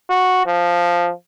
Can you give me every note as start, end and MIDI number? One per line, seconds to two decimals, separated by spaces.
0.10 0.42 66
0.47 1.12 53